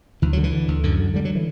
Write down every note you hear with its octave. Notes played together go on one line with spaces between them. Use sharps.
D2 E3
D3 F#3
E3
D3
D2
F#2 D3
D3
D3 G3
F#3
E3